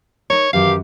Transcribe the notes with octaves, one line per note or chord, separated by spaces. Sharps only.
D#4 A#4 C#5
F#2 D#3 E3 F#4 G4 F5